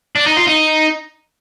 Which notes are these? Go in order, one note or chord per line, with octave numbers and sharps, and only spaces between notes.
D4
D#4
F4
D#4